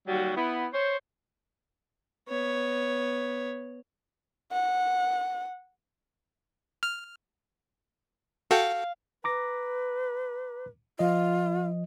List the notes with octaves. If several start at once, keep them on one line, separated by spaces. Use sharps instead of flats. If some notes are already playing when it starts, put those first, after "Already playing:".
D#2 F#3 G3 F#4
B3 E4
C5 C#5
B3 C#5
F#5
F6
F#4 A4 F5 G5
B4 A#5 D6 A#6
F3 F4 D#5